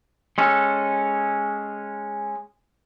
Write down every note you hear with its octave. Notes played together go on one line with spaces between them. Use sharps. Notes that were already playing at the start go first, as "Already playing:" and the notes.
G#3 C#4 A4